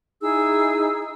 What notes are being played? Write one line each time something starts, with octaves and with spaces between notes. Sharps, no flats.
D#4 E4 G#4 E6